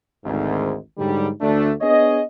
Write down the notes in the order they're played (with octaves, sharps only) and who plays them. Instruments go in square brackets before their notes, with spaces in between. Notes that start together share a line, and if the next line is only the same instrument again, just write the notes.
[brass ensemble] G#1 D2 G#2
G#2 D3 F#3 G3
D2 A3 D4
B3 D4 G#4 C#5 D#5